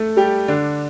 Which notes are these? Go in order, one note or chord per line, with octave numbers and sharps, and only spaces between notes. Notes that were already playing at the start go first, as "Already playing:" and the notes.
Already playing: A3 A4
G3 G4
D3 D4